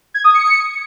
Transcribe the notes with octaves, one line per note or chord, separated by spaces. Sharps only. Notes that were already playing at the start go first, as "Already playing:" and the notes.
G#6
D#6
C#7